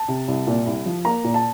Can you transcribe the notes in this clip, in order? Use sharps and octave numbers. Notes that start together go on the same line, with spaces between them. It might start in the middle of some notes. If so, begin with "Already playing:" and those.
Already playing: A5
C3
C2
A#2
C2
F3
A#3 A#5
A#2
A5